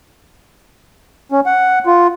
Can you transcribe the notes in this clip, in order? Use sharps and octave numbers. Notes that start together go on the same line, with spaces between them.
C#4
F#5
F4